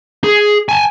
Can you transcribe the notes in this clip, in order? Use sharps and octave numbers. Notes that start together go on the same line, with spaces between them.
G#4
G#5 A5